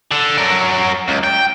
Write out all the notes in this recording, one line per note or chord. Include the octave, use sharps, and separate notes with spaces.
D3
F#3 A#4
C#2
G5